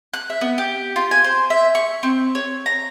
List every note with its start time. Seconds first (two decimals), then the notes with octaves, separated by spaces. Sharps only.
0.13 F#6
0.30 E5
0.41 B3
0.58 G4
0.96 F4
1.11 G#5
1.24 C5
1.50 E5
1.75 C#6
2.03 C4
2.35 C#5
2.66 A#5